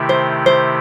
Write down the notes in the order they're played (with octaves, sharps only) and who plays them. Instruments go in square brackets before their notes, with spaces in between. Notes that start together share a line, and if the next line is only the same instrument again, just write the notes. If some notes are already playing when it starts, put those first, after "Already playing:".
Already playing: [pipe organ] C3 D#3 A3 E4 G4
[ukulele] C5
C5